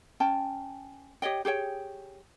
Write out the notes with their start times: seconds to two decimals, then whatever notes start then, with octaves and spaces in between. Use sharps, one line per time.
0.20 C#4 G5 A5
1.22 G4 C#5 D#5 G5
1.45 G4 G#4 C#5 G5